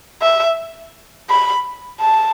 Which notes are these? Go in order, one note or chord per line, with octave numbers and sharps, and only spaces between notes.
E5
B5
A5